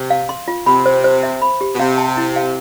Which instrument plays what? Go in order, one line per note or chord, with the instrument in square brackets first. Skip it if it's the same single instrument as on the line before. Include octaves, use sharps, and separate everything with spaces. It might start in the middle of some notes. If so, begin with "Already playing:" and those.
Already playing: [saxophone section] C3
[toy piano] F5
C6
F4
[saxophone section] C3 [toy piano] B5
[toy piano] C5
C5
E5
B5
G4
[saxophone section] B2
[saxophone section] C3 [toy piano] F5
[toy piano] A5
E4
F5